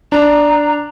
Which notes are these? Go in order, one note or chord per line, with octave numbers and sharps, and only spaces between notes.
D4 A#5